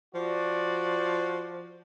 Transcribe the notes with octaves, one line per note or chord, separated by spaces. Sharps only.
F3 F#4 D5